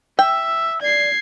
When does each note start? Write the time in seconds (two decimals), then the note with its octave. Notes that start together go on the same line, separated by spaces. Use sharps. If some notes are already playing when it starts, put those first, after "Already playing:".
0.19 E5 G5 E6
0.82 D5 G#6 C7